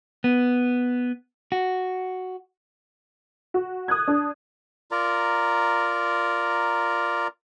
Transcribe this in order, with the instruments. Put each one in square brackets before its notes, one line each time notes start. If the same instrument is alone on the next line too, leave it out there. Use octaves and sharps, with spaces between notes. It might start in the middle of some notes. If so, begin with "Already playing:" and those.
[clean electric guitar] B3
F#4
[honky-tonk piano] F#4
D#6 F#6 G#6
D4
[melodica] F4 A#4 D5 A#5